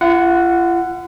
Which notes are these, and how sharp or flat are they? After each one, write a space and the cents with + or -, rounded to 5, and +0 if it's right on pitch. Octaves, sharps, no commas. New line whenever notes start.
F4 -45 F#5 +0